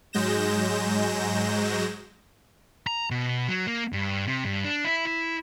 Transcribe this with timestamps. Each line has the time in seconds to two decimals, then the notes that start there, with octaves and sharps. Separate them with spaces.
0.13 G#2 F#3 G#3 G6 A#6 E7
2.87 A#5
3.10 B2
3.48 F#3
3.67 A#3
3.93 G2
4.27 C3
4.44 G2
4.65 D4
4.85 E4
5.07 E4